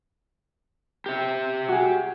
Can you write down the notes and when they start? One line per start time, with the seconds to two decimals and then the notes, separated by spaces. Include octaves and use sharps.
1.06 G4 E5
1.68 F#4 G#4